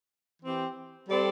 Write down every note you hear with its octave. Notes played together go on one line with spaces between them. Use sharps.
E3 C4 G4
G3 C4 A4 D5